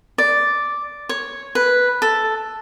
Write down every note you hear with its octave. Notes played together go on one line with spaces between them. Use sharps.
D5
C#5
B4
A4